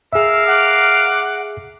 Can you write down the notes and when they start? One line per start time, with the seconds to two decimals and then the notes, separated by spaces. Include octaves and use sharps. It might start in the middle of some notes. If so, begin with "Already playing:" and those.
0.13 G#4 A#4 E5 F5 E6
0.47 F#5 D6